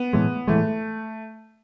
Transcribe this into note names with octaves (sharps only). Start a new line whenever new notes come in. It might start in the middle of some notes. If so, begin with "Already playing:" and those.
Already playing: B3
A2 E3 G#3
A2 E3 G#3 A3